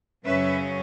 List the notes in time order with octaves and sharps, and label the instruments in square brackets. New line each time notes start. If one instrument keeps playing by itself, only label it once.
[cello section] F#2 C#3 F#3 C#4 B4 E5